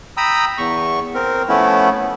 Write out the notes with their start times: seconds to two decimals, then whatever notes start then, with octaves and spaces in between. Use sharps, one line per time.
0.17 G5 A#5 B5 D#6 E6
0.58 E2 C#6
1.15 C4 A#4
1.49 F3 A3 B3 C#4 E4